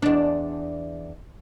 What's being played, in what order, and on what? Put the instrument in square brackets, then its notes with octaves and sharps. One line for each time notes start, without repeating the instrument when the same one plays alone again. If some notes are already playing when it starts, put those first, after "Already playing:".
[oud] E2 D4